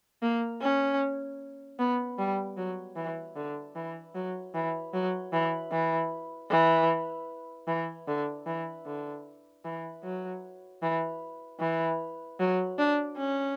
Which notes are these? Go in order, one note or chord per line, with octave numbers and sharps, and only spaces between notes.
A#3
C#4
B3
G3
F#3
E3
D3
E3
F#3
E3
F#3
E3
E3
E3
E3
D3
E3
D3
E3
F#3
E3
E3
F#3
D4
C#4